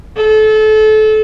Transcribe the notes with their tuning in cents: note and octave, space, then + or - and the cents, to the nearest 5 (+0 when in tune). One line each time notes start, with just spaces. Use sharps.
A4 -30